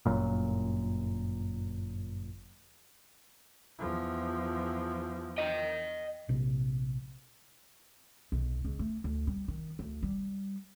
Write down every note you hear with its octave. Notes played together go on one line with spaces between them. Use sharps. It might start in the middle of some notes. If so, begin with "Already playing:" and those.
G1 F#2 A#2
E2 F3
D#5 G5
A#1 C3
B1
C#2
A3
D2
G3
D#3
D2
G3